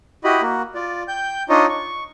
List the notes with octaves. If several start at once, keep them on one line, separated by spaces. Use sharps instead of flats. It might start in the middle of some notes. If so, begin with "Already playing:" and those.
E4 F#4 G4 D#5 B5
A#3 F#4
F4 D5
G5 G6
D4 D#4 F4 C#5 D#5
C#6